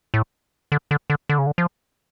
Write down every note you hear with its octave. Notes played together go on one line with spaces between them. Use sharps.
A2
D3
D3
D3
D3
C#3
D3
F3